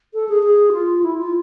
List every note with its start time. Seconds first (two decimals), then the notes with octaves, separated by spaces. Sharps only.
0.14 A4
0.29 G#4
0.43 G#4
0.73 F4
1.03 E4
1.18 F4